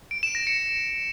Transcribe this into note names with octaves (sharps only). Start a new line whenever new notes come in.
D7
E7
A#6
C#7